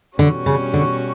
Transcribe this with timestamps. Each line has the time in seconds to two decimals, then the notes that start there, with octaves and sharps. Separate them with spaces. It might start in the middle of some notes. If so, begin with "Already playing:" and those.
0.18 B2 D3 G3 C#4 F#4
0.46 C#3
0.74 D3